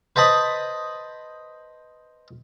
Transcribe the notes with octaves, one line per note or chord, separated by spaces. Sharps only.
B4 C5 D#5 A5 B5 D#6